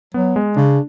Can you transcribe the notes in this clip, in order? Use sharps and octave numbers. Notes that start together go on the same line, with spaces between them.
F#3 B3
G#3
C#3 D4